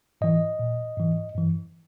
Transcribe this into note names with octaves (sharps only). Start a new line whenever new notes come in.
G#2 E3 D#5
A#2
G#2 E3
G2 E3